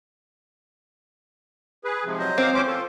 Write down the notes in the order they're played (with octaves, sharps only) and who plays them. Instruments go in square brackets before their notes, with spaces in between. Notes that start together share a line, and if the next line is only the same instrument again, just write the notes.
[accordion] G#4 B4
G#2 C3 F3
[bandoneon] F#3 C5 D#5
[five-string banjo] C4 [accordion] F5 D6
[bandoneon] A#2 E3 G#3 [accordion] C#4 C5 D6
[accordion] F4 [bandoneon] A4